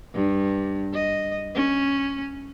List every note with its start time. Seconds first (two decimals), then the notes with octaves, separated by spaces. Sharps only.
0.14 G2
0.93 D#5
1.55 C#4